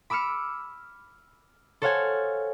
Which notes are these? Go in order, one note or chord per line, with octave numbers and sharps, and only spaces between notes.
B5 D6 E6 F6 C#7
A4 C5 C#5 F5 F#5 G#5